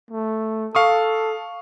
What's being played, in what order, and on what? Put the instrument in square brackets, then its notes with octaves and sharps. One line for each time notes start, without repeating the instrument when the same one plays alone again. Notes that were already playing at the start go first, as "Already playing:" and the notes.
[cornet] A3
[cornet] A4 [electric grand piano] F5 C#6 D#6